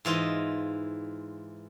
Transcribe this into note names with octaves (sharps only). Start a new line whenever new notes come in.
G#2 E3 F4 D#5